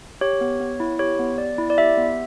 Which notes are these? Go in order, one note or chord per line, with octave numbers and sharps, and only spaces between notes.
G4 C#5
B3
B3
E4
G4 C#5
B3
B3 D5
E4
D5
G4 E5
B3